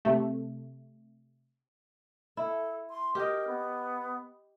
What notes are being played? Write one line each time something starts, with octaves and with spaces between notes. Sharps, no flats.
C3 A3
E4 A4
C6
G4 A#4 D#5
B3